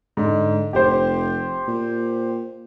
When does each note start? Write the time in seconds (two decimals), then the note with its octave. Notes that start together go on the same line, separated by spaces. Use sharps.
0.17 G#2 D3
0.73 F1 G4 C5
1.68 A#2